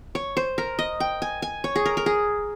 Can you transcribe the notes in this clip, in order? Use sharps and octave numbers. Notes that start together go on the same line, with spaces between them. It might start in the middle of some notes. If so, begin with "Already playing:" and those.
C#5
C5
A#4
D#5
G5
G#5
G#5
C#5
G#4
A#4
A#4
G#4